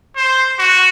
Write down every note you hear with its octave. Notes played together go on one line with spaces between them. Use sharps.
C5
F#4